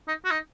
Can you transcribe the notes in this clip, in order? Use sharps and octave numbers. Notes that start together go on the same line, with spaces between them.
D#4
F#4
D#4